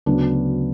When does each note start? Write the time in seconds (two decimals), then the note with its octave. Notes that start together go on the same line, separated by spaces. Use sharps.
0.06 D2 C#3 F#3 B3 D4